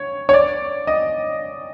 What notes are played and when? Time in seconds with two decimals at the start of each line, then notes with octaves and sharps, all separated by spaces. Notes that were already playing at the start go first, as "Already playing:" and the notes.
Already playing: C#5
0.29 C#5
0.34 D5
0.87 D#5